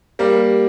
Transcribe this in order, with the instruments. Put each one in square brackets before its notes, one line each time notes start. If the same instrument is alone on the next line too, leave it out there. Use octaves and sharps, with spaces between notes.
[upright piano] G3 A#3